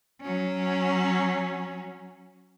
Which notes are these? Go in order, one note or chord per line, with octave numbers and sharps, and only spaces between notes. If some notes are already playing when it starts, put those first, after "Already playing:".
F#3 C#4